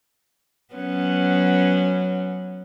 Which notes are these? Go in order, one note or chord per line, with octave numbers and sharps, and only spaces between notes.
F#3 B3 C#4